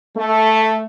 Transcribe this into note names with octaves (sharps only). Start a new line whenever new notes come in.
A3